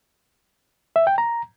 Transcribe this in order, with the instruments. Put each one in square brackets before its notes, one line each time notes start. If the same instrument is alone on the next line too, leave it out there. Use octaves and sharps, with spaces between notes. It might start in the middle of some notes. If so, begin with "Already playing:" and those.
[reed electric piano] E5
G5
A#5